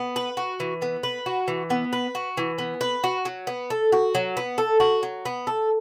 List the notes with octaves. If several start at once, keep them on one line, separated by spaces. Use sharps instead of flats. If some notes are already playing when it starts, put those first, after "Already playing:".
Already playing: B3
B4
F#4
E3
B3
B4
F#4
E3
B3
B4
F#4
E3
B3
B4
F#4
F#3
B3
A4
F#4
F#3
B3
A4
F#4
F#3
B3
A4